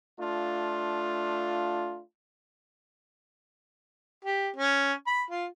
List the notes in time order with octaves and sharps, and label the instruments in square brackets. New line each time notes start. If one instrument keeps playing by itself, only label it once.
[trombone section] A3 D4 F4
[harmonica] G4
C#4
B5
F4